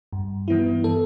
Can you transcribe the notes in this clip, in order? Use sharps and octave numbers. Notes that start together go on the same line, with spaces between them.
G2
E3 B3 E4
A4